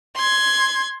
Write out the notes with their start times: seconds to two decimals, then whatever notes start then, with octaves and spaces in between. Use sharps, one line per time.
0.16 C6 G#6